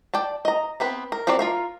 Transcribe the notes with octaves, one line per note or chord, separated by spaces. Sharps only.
D5 G5 A5
D#5 A#5
B3 C4 B4
A#4
F#3 C4 F#4 A#4 D5
F4 A#4 F5